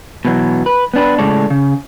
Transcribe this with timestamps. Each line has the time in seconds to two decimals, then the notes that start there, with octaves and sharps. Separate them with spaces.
0.25 B2 E3 F#3
0.66 B4
0.94 B3 D4 B4
1.18 A2 C#3 G#3 A4 C#5 D5
1.50 C#3